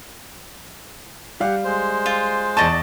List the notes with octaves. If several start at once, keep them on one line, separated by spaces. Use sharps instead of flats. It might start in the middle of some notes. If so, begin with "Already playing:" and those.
G3 G4 F5 F#5
G#3 C5
F4
E2 D5 D#5 A5 C#6